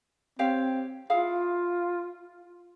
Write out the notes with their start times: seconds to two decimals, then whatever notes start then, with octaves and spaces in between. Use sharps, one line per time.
0.39 C4 G4 C#5 F5
1.10 E4 F4 G#4 F5